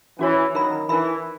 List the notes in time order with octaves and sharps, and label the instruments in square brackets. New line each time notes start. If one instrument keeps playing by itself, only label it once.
[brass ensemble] E3 [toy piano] C#4 F#4 C#5
[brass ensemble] D#3 F#3 [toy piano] D#4 A#4 E5 B5
[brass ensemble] E3 [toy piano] D#4 A#4 E5 B5